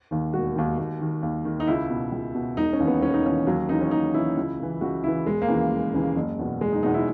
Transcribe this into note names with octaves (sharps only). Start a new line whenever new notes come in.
D#2 D#3
E1 F#4
D#2 D#3
D#2
D#3
D#2
D#3
D#4
C#2 E4
B2
C#2
B2
E1 D#4
C#4
D#2 C#3 E3
B3
E1 C#4
D#4
D#2 C#3 E3 C#4
D#2 F#3
C#3 E3 D#4
C#4
D#2 D#4
C#3 E3 E4
C#2
C#3 E3
C#2 F#4
C#3 E3 E4
E1 G#3
A#3
D#2 C#3 E3
E1
D#2 C#3 E3
F#1
E2 B2
F#1 G#3
D#4
E2 B2 D#4
E4